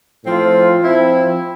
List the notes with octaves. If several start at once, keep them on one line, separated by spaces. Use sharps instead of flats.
A2 F3 C4 F4
F3 C4 E4